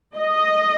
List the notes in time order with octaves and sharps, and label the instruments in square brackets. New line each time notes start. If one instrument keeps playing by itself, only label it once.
[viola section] D#5